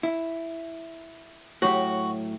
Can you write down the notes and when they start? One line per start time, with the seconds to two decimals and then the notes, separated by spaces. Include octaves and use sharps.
0.03 E4
1.62 A2 F#3 F#4 G4